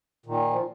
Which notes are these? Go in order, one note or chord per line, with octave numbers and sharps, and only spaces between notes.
A#2 D#3
F3